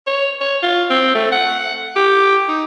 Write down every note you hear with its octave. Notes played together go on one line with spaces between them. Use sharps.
C#5
C#5
F4
C4
A3
F#5
G4
D#4